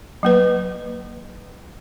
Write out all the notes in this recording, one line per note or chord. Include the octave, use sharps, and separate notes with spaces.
F#3 A#3 B4